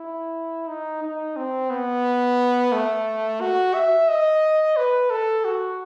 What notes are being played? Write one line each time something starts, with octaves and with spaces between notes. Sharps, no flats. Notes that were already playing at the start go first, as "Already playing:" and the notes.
Already playing: E4
D#4
D#4
C4
B3
A3
F#4
E5
D#5
B4
A4
F#4